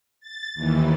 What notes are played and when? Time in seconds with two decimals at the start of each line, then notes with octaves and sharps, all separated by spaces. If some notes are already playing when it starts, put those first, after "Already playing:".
0.20 A6
0.55 D#2 E3